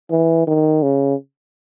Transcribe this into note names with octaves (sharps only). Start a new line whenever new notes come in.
E3
D#3
C#3